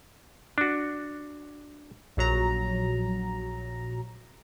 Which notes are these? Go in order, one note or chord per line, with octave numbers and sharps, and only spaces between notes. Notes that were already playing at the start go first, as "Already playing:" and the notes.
D4 F#4
A#1 F#3 A#5